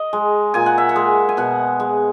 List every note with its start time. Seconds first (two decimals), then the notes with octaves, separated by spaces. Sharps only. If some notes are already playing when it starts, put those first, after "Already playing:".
Already playing: D#5
0.13 G#3
0.54 A#2 G#5
0.66 F#5
0.78 E5
0.89 F#5
0.96 G#3
1.29 G#5
1.37 B2 F#5
1.80 G#3